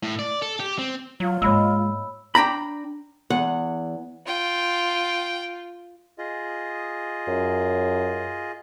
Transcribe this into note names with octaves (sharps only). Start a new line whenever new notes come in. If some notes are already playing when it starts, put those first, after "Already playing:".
A2
D5
A4
G4
C4
F#3 F4
G#2 G#3 A#3 C#5 B5 E6
D4 G5 A#5 B5
E2 F#5
F4 G5
F4 G#4 D#5
F#2